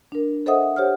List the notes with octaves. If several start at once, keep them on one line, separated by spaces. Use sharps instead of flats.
D4 A#4
A4 C5 D#5 E5 F#5 D#6
G4 C5 C#5 F#5 F6